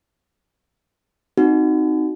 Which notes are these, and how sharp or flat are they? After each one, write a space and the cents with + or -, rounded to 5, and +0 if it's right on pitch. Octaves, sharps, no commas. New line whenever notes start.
C4 -5 D#4 +0 F#4 +0